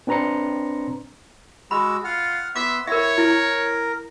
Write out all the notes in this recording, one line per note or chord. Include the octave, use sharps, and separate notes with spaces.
C4 D4 B4 A#5 C6 C#7
G#3 F#4 B5 E6
F4 F#5 F6
B3 E5 C6 D6
E4 A#4 C#5 E5 C#6
E4 A#4